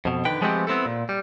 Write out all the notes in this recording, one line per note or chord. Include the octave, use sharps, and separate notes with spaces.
F2 B2
D3 D#3 B4 G5
F3 G#3 A3 B3 C4 G4
B3 C4 E4 A4
A#2
G3